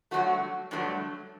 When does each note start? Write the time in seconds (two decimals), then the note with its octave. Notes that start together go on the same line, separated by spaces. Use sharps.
0.11 G2 D3 F#3 A3 F#4
0.71 G2 D3 F#3 A3